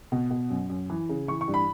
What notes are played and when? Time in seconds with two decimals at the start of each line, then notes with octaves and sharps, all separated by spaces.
0.12 B2
0.30 B2
0.50 F#2
0.69 F#2
0.90 E3
1.09 C#3
1.28 E3 C#6
1.41 C#6
1.48 G2
1.54 B5